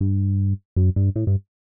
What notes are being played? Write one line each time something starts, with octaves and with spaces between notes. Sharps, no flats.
G2
F#2
G2
A2
G2